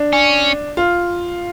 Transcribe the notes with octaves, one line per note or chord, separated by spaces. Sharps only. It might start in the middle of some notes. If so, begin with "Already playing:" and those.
Already playing: D4
C#4
F4